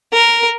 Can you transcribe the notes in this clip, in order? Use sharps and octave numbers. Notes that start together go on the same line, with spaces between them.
A#4